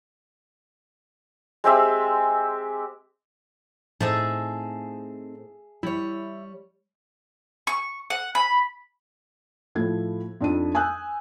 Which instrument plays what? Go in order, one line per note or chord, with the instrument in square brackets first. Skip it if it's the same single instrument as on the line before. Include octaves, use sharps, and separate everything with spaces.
[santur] G#3 C4 G4 E5
[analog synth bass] A2 [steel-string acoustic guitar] C4 D#4 [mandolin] G#4 E5 A5
[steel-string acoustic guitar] G3 C#5 [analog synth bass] E4
[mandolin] C#6
F#5
B5
[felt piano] A2 F3 A3 G#6
F2 D4 D#4 D#7
G#5 D#6 E6 F#6 G6